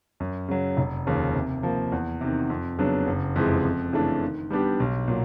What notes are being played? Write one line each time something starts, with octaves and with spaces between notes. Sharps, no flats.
F#2
C#3 F#3
F1
D#2 C#3 F3
C3
F3 A#3
E2
C3 D#3
F2
C#3 F#3 B3 D4
F#1
F2 C3 E3 G#3
F2
C#3 E3 A3 D4
D#3
G3 B3 D4 G4
B1
A#2 F#3